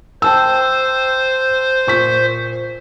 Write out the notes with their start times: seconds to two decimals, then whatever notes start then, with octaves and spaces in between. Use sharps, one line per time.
0.22 C5 G5 A5 E6
1.87 A#2 C#6 B6